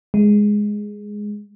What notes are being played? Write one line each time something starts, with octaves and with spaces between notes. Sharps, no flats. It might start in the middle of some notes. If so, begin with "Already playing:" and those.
G#3